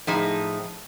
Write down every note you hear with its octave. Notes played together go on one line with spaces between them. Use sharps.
A2 F3 D#4 E4 G#4